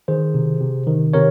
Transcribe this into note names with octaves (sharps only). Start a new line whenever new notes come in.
D#3 G#4 C5
C3
C3
D#3
C3 A#4 C#5